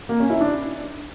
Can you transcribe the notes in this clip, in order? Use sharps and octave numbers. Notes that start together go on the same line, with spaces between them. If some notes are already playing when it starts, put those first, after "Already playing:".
A#3
C#4
E4
D4